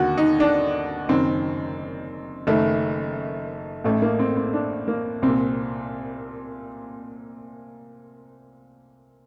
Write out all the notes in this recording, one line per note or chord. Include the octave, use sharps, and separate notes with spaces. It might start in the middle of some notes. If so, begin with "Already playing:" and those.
Already playing: D#2 D3 F#4
D#4
D4
F#1 F#2 D#3 C4
F#1 F#2 D#3 A3
A1 A2 A3
A#3
C4
C4
D4
A#3
C2 A#2 C4